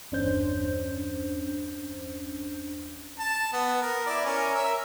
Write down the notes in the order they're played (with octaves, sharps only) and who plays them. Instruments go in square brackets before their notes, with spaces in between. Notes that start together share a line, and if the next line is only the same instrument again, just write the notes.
[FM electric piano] G1 E2 C#4 D4 C5 G6
[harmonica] A5
B3
A#4
E4 D5
C#4 A#4
A#4 E5